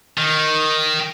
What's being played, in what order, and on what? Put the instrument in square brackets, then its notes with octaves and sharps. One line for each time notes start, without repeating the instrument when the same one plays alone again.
[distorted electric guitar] D#3